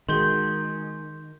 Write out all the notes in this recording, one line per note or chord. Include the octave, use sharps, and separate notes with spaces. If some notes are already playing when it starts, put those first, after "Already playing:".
D#3 G#3 F#4 G#4 C6 G6 G7